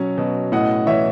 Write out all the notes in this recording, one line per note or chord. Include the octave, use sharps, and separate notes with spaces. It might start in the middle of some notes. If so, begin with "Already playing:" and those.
Already playing: B2 F#3 C#4
B2
A2 D#5 F#5
E3 C#5 E5